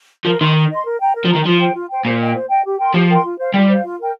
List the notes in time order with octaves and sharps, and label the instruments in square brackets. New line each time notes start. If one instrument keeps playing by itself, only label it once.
[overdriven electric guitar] F3 [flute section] A#4
[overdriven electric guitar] D#3 [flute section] D#5 C6
[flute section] A#4
D#5 C6
A#4
G5 A#5
A#4
[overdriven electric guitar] F3
[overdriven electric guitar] D#3 [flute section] G5 A#5
[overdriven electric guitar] F3 [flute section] F4
[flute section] C5 G5
F4
C5 G5
[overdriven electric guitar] A#2 [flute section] C5
[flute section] D#5 G5
C5
D#5 G5
G4
A#4 G5 C6
[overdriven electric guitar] F3 [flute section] G4
[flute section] A#4 G5 C6
F4
C5 F5
[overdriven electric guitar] G3 [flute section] F4
[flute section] C5 F5
F4
A#4 G5